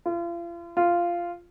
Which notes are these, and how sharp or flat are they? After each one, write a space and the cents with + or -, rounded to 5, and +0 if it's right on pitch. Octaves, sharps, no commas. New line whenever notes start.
F4 -40
F4 -10